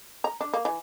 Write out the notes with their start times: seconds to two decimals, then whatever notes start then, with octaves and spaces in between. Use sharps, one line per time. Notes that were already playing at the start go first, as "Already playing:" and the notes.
0.24 A#5
0.41 D4
0.54 A#3
0.65 E3